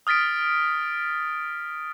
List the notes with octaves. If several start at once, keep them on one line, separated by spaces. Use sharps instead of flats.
D#6 F6 A6 B6 D7